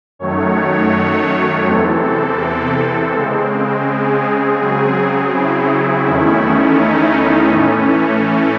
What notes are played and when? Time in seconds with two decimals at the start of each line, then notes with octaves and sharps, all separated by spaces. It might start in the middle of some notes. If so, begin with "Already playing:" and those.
0.19 F#2 D#3 F#3 A3 C#5
1.66 E2 C3 E3 C4 A4
3.13 C#3 G#3 C4
3.87 G#4
4.59 C#3 F#3 C4
5.32 E4
6.06 E2 D#3 A3 C#4
6.79 D#4
7.52 A2 E3 A3 C#4